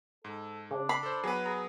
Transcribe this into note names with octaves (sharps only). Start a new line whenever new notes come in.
G#2 A4
C#3 D4
B5 C7
A4 C5
F#3 B3 G#4 B4
G#4 A#5